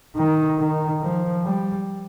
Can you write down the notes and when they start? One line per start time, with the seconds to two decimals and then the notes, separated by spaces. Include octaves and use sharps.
0.16 D#3
0.58 D#3
1.01 F3
1.44 G3